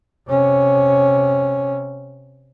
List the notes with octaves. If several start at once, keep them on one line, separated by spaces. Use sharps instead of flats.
C3 C#4